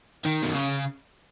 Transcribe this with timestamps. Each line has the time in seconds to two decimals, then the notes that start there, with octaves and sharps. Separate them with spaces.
0.25 D#3
0.43 B2
0.54 C#3